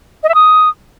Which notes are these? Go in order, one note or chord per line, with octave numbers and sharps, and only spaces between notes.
D#5
E5
D#6